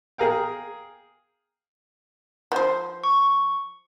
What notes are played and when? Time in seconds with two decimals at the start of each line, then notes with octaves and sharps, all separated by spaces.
0.18 G#4 A#4 F5 G5
2.52 F3 C5
3.04 C#6